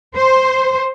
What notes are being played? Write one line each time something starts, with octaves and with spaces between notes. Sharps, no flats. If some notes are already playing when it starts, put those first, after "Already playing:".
C5